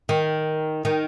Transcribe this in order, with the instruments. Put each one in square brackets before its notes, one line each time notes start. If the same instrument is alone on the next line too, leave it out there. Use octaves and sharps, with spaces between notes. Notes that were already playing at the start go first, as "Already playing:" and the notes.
[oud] D#3
D#3